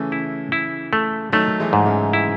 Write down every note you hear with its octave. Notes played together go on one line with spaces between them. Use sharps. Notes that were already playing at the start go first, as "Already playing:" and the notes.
Already playing: C#3 E3 A3
E4
E4
A3
D#3 F#3 A3
E3 G#3
G#2
C#3 E3
E4